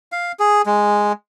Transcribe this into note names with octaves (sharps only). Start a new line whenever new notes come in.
F5
G#4
G#3